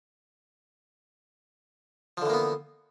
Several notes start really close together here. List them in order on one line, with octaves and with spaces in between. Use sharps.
F3 D3 E3 A#3 B3